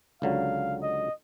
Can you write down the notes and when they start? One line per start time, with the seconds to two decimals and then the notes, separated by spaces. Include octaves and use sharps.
0.22 C#2 D3 F#3 F5
0.82 D#5